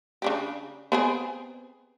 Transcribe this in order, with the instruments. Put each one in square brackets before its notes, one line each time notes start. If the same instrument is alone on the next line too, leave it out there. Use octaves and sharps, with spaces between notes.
[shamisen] C#3 D4 G4
B3 C4 G#4